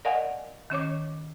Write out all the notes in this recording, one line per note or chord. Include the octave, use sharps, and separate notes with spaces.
A#4 D5 D#5 F5 F#5 G#5
D#3 C#4 C#5 D6